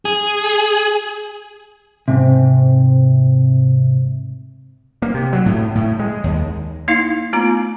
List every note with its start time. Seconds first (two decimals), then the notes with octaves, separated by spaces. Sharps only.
0.05 G#4
2.08 G#2 C3
5.02 A#3
5.14 C3
5.33 F#3
5.46 A2
5.75 A2
5.99 G#3
6.24 D#2
6.88 A#3 D#4 E4 F5
7.33 A3 B3 F4 A#5